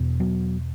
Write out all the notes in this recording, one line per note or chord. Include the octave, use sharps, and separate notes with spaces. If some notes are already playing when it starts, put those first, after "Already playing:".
Already playing: E2 B2
F#3 B3